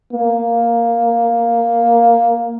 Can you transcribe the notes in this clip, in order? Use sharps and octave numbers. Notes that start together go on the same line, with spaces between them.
A#3